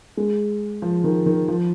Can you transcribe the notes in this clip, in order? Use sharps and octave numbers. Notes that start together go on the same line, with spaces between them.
G#3
F3
D#3
D#3
F3